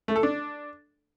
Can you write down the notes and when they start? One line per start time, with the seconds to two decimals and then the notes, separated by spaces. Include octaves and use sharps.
0.08 A3
0.16 A4
0.23 D4